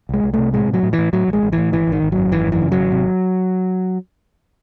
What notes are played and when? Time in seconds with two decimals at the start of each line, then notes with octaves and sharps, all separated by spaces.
0.09 C2 G#3
0.24 C2
0.34 C3 A3
0.53 A2 G#3
0.68 A2
0.74 F#3
0.83 A2
0.93 E3
0.98 A2
1.13 A2 F#3
1.28 A1
1.33 G#3
1.43 A1
1.52 E3
1.58 A2
1.72 G#1 E3
1.87 G#1 D#3
2.02 G#1
2.12 F#3
2.17 F#2
2.32 G#1 E3
2.47 F#2
2.52 E3
2.62 C#3
2.72 F#3
2.77 G#1
2.92 C3